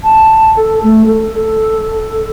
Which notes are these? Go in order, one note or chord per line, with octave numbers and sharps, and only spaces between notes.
A5
A4
A3
A4
A4